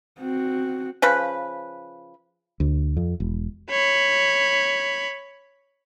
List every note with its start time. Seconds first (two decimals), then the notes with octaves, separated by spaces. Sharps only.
0.21 C4 F#4
1.02 C#3 F3 B4
2.60 D2
2.97 F2
3.20 E1
3.70 C#5 B5